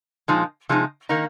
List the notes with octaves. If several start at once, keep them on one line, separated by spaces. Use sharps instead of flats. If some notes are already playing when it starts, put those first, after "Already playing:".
A#2 F3 G#3 D#4
C3 F3 G#3 D#4
D#3 A#3 D#4